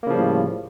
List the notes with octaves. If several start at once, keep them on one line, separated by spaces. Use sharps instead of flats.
A2 C#3 F3 G3 A#3